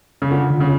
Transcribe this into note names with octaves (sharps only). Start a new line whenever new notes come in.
C#3
D3 F4
D3
C#3